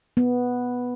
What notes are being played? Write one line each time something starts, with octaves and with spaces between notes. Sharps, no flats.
B3